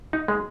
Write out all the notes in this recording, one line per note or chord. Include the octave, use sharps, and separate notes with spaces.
D#4
G#3